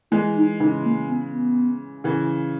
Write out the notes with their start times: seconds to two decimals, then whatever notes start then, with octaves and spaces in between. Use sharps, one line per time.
0.11 E3 G#3 E4
0.36 D#4
0.59 C#3 E3 D#4
0.84 A#3
1.08 B3
1.32 B3
2.04 C#3 E3